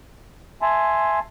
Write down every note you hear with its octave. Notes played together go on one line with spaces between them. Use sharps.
E5 G#5 A5 C6